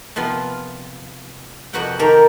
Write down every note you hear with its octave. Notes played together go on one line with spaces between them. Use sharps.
C3 F3 B3 F4
F2 C3 F#4 B4 F#5 G5
D#3 G4 A4 A#4